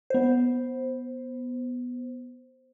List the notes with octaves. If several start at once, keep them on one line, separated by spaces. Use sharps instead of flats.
B3 C5